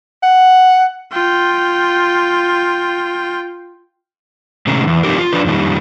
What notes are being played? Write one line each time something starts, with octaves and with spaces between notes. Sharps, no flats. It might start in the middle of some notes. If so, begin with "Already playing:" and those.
F#5
F4 G5
A2 C3 D#3 G#3 C#4 D#4
E2
F3 C4 C#4 D#4 G4 A#4
F4
F3 D4 B4
F2 A#2 D#3 G3